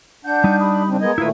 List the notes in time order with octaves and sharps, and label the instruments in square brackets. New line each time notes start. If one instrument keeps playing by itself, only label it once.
[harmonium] D4 [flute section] F#5 G6
[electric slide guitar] G3 D#4
[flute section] G4 B5 D#6
[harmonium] C#3 C4 D4
[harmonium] G#3 B3 D#5 [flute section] A#4 D#6 G#6
[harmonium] A#2 D#3 A3 [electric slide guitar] E4 F4 B4